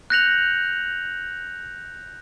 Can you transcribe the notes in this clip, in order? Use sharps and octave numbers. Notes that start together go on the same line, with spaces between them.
F#6 G6 A#6 C#7 F7 F#7